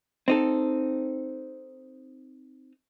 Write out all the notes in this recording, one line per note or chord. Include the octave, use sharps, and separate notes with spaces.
C4 D#4 A4